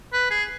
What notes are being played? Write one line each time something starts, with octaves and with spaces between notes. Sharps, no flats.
B4
G#4